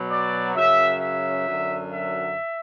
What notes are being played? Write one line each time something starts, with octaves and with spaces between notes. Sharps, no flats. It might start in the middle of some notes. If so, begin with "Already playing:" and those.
Already playing: B2 F#3
D5
F#2 C#3 F#3 E5
E5
F#2 D3 F#3
E5